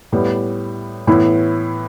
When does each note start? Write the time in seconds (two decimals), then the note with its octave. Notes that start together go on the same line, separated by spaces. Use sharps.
0.12 A2 G3 B3
1.07 A2 E3 B3 E4